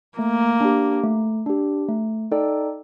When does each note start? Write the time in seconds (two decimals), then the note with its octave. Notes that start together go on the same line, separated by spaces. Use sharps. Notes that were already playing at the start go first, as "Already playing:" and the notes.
0.18 A3 A#3
0.61 D4 G4
1.03 A3
1.46 D4 G4
1.89 A3
2.31 D#4 A4 D5 G5